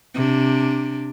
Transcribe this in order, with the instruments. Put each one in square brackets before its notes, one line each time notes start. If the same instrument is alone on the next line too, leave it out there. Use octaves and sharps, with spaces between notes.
[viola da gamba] C3 D4